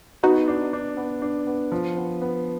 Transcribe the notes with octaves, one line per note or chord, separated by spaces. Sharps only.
B3 D#4 F#4
D4
D4
B3
D4
B3
F3
B3
B3